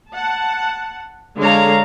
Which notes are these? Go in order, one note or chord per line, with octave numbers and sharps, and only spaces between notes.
F#5 A5
D3 G#3 D4 C#5 F5 A#5